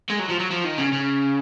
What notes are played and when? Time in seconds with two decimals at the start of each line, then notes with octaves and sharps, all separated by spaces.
0.10 G#3
0.20 F#3
0.30 F3
0.40 F#3
0.51 F3
0.65 D#3
0.78 C#3
0.93 C#3